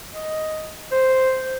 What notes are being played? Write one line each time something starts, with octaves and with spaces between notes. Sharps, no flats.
D#5
C5